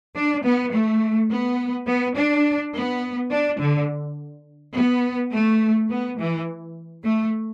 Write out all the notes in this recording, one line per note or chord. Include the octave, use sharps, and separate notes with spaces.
D4
B3
A3
B3
B3
D4
B3
D4
D3
B3
A3
B3
E3
A3